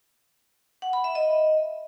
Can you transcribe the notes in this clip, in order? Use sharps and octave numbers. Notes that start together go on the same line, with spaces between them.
F#5
B5
E5
D#5